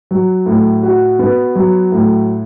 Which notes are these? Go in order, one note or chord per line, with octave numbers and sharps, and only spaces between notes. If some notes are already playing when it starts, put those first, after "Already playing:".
F#3
A2
F#4
B3
F#3
A2